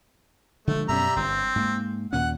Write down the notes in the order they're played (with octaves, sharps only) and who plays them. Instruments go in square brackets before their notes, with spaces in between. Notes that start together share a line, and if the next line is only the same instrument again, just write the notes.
[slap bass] D3 F3 G#3 [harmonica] A3
[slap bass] F#2 B2 C#4 [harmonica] G3 E5 A#5
[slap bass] G1 [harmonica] C4
[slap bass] G#2 A#3
[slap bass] D#2 A#2 C#4 [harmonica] F#5